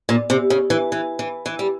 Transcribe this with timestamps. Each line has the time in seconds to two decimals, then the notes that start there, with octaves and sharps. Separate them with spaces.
0.09 A#2
0.30 C3
0.50 C#3
0.70 E3
0.92 E3
1.19 E3
1.46 E3
1.59 G3